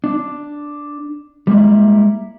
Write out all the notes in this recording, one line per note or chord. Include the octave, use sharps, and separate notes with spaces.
D4
G3 G#3 A#3 E4